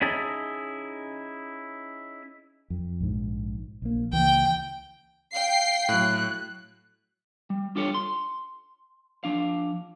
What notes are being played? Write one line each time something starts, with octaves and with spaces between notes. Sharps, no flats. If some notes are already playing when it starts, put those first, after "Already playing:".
C#4 D#4 E4 G#4 D#5 A5
F2
A#1 G#2
A#1 A#3
C#2 E3 A#3 G5
F5 G5 C7
A2 F#3 F#6
G3
D4 F4 G4 A4 B4 C#5
C6
F3 D4 F5